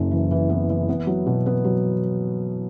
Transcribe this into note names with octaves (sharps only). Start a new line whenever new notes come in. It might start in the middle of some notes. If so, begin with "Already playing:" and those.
Already playing: F#1 F#2
E3
E3
B3
E3
B3
F#3
B2
B3
F#3